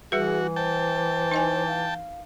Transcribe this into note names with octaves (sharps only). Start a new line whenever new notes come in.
E3 G3 F#4 G#4 B4
C5 G5 A5
D#4 D#5 G#5
F5